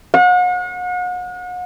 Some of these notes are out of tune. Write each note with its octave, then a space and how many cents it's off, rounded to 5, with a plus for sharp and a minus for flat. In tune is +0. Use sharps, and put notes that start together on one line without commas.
F#5 -40